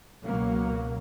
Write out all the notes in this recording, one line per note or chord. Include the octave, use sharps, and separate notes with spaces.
C#2 B2 F#3 A#3